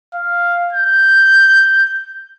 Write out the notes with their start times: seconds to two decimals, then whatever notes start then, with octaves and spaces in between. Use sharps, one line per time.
0.14 F5
0.73 G6